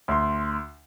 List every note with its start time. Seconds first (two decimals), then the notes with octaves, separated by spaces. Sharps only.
0.08 D2 C6